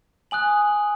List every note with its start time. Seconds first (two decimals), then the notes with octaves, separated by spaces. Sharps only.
0.31 G#5 D#6 F#6 F#7